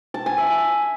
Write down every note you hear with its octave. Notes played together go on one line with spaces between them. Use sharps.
A5
G#5
E5